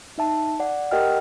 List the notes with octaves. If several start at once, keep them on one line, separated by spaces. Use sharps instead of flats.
D#4 E5 A5
D5 F#5
G4 A#4 D#5 F#5 G5 F6